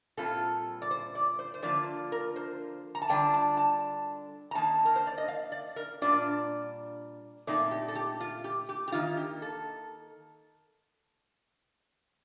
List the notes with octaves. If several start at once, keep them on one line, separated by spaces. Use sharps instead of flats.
A#2 G3 C4 F4 A4
D5
C5
D5
C5
C5
D3 F3 A#3 F4 D5
A#4
C5
A#5
A5
D3 G3 D4 F4 G5
A5
A5
A#5
D#3 A#3 D#4 A5
A#4
C5
D5
D#5
F5
D5
A#4
A#2 G3 D4 F4 D5
A#2 A3 C4 D#4 D5
G4
A4
G4
F4
G4
G4
G4
D#3 A#3 D#4 F4
G4
A4